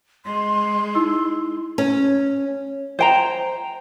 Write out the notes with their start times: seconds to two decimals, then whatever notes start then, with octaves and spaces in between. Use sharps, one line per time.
0.25 G#3 C6
0.95 D#4 E4 E6
1.78 C#4
2.99 C5 G5 A#5